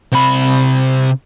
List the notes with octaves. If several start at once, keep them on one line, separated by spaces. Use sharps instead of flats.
C3 B5